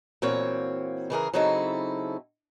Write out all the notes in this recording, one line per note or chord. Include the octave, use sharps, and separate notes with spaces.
A#2 E3 C4 F#4 C#5 F5
C#3 E3 G#4 A#4
C#3 F#3 C4 D#4 E4 A4